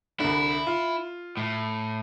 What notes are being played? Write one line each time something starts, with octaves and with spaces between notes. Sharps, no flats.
C2 D3 E4
F4
A2